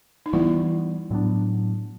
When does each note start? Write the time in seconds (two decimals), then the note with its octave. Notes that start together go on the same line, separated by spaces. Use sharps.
0.26 D#4
0.33 E3 G3 B3 E4
1.11 A2 F#3 B3 D4